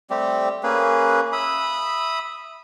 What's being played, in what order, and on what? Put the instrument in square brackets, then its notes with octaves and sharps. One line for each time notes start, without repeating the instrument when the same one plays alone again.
[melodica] G3 A3 C4 G4
A#3 C#4 G#4 B4
E5 B5 D#6